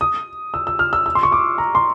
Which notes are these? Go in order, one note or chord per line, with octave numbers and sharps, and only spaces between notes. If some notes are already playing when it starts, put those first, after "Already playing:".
D#6
E6
E6
F6
E6
E6
C6
C#6
D6
A#5
C6